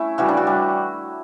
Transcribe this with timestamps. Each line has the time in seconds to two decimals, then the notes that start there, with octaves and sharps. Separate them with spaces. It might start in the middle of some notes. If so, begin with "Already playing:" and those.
Already playing: A3 C#4 E4
0.18 C#3 E3 G3 F#4
0.28 D4
0.37 F#4
0.47 G3